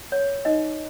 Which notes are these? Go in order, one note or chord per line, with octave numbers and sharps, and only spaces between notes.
C#5
D#4 D#5